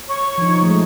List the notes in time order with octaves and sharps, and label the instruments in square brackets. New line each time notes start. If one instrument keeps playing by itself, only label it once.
[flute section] C#5 C#6
[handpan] F3 D#4
F3 G#3 A3